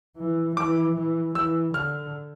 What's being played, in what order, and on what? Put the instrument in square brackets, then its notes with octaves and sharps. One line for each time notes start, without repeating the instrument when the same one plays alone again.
[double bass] E3
[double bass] E3 [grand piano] D6
[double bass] E3
[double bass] E3 [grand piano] E6
[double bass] D3 [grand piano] F6